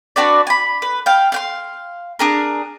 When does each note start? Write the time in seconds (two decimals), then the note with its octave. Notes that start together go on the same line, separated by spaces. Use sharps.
0.16 D4 F#4 B4 D5
0.47 G#5 B5
0.82 B4
1.06 F5 G5
1.32 F5 G5 C6
2.19 D4 G#4 A#4